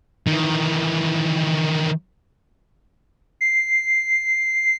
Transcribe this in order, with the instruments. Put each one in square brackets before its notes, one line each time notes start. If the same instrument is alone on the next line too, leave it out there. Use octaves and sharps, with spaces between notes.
[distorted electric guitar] D#3 E3
[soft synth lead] C7